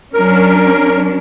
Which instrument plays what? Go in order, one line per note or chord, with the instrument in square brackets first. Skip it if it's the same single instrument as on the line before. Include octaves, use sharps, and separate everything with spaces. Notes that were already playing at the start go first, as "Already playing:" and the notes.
[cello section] F#3 C#4 D4 [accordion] A#4